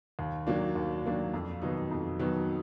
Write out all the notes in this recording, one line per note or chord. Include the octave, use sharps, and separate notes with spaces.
D#2
D#3 F#3 A#3 D4
D#2
D#3 F#3 A#3 D4
F2
D#3 F#3 B3 D#4
F2
D#3 F#3 B3 D#4